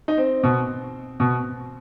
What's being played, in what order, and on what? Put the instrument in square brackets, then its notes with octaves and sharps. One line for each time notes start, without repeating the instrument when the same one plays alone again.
[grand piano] D#4
C4
B2
B2